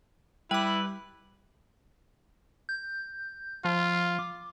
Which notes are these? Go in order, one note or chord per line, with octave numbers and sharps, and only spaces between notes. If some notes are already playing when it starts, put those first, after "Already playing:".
G3 E4 B4 G5 D6
G6
F3 F4
D6